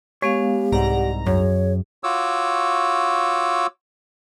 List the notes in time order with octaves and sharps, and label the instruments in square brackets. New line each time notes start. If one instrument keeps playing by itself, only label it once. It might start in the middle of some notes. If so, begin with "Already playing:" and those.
[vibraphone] G#3 B3 F5 [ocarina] G4 [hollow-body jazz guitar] C#5
[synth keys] C2 G#2 A#5 [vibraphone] D5 F#5
[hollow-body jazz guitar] F#2 [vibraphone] G#4 [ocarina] C#5
[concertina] F4 F#4 C#5 D6 E6